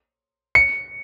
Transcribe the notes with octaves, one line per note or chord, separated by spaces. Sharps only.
C#7